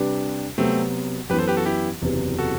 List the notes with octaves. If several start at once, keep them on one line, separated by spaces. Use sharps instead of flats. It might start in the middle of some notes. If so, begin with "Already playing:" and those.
Already playing: C3 G3 D4 G4 B4
C3 F#3 A3 B3 C4 F#4
F#2 E3 B3 G4 B4
A4 C5
G4 B4
F#4 A4
E4 G4
F#1 E2 C3 F#3 B3
F#4 A4